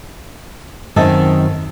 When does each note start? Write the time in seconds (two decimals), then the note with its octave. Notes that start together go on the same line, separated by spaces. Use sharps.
0.96 F#2 D#3 C4 D#5 E5 A5